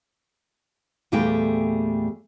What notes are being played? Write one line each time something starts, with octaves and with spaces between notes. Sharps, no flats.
E2 A#2 G3 A3 G#4 G5